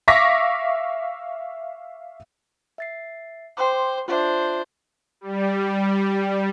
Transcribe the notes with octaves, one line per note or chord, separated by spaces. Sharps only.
E5 F5 C#6 D6 A#6 B6
E5 A6 C7
C5 G5 C6 D6
D4 F4 C5 E5
G3